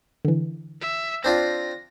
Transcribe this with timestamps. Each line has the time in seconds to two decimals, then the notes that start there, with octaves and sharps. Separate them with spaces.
0.25 D3 E3
0.81 E5
1.24 C4 D4 F4 A#6